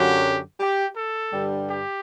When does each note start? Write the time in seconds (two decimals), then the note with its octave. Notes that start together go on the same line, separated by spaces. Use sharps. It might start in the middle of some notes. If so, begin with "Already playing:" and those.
Already playing: F#2 D3 F#3 G4
0.60 G4
0.96 A4
1.32 G2 D3 G3
1.67 G4